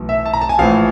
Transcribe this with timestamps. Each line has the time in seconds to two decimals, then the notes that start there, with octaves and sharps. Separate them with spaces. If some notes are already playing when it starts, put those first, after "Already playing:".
Already playing: B1 A2 E3
0.09 E5
0.26 A5
0.33 A#5
0.41 A5
0.49 G#5
0.58 A#1 A2 E3 F5